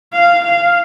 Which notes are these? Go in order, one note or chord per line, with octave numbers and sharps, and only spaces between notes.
F5
F5